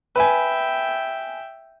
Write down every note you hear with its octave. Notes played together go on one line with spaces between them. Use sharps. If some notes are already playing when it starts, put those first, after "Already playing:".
B4 E5 G5 G#5